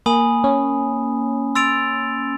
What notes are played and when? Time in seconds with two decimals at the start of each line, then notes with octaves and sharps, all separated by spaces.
0.06 A#3 G#5 B5 D#6
0.44 C#4
1.55 C6 E6 A6 D7 F7